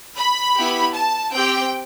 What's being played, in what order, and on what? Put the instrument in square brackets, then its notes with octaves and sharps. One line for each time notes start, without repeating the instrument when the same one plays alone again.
[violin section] B5
B3 E4 G4
A5
C4 G4 G5